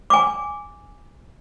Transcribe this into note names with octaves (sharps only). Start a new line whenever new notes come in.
G#5 D6